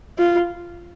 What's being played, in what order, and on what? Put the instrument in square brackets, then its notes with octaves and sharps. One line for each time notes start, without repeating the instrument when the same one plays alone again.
[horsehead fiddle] F4